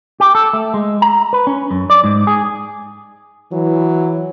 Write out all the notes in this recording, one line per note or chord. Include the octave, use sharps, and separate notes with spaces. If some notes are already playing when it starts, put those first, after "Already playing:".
G4
A4
A3
G#3
A#5
B4
C#4
F#2
D5
G#2
G#4
E3 F#3